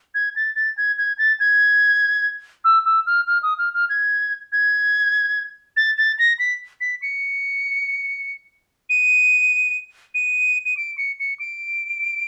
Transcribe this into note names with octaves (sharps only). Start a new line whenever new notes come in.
G#6
A6
A6
G#6
G#6
A6
G#6
E6
E6
F6
F6
D#6
F6
F6
G#6
G#6
A6
A6
A#6
B6
B6
C#7
D#7
D#7
D#7
D7
C#7
C#7
D7